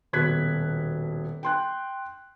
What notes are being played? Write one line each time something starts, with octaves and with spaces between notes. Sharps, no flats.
D#1 B2 F#6 G#6 B6
G5 C6 F#6